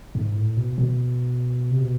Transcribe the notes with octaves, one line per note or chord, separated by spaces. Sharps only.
G#2
A2
B2
B2
C3
B2